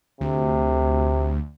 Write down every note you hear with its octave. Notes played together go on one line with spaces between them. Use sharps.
D2 C3